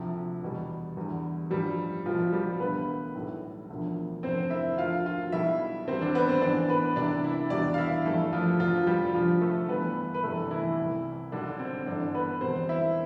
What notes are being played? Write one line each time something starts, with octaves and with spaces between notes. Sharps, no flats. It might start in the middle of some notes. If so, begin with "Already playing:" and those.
Already playing: D2 C3 F3
E2 B2 G3
E2 D3 G3
A1 G2 F3 G3 G4
C2 B2 F3 G3 F4
G3 G4
E1 D2 D3 B3 B4
B1 A2 G3
E1 D2 D3 F3
F1 F2 D3 C4 C5
E4 E5
D2 D3 F3 F4 F5
F4 F5
B1 B2 G3 E4 E5
E2 D3 G3 C4 C5
D3 D4
B3 B4
C4 C5
B1 A2 E3 D4 D5
B3 B4
C2 C3 E3 G3 D4 D5
E4 E5
E2 B2 G3 D4 D5
F5
E4 E5
G1 F2 E3 G3 A3 A4
F3 F4
F1 F2 D3 F3 F4
G3 G4
F1 F2 D3 F3 F4
A3 A4
G1 G2 E3 G3 B3 B4
B4
G1 F2 C3 E3 G3 A3 A4
E3 E4
C2 C3 E3
B1 B2 D3 G3 D4
C4
G1 G2 D3 E3 D4
B3 B4
E1 E2 B2 G3 C4 C5
E4 E5